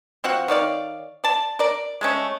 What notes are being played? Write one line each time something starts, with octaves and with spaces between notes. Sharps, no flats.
F3 C4 F#4 F#5
D#3 C#5 D5 F5
D5 A5
A#4 D5
G#3 A3 C#4